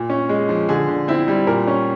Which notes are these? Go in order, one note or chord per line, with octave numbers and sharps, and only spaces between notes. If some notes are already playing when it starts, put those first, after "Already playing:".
Already playing: A#2
C#4
G#3
F3
D3 G#4
D3
C4 E4
G3
A#2 A#4
C#4